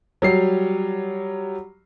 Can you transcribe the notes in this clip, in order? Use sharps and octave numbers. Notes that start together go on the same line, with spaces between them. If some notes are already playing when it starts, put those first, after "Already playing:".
F#3 G3 C7